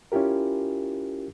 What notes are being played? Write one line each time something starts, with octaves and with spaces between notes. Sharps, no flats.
C#4 E4 F4 G4 A#4